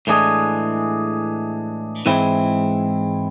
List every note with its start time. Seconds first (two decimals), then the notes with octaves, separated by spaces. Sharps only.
0.07 A2 E3 G#3 D4 G#4
2.06 G#2 E3 G#3 C4 E4